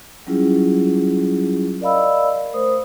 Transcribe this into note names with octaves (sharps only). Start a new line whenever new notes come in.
F#3 G3 C#4 E4 F4 G#4
A#4 D5 D#5 F5 B5 E6
A3 A#4 C5 D#6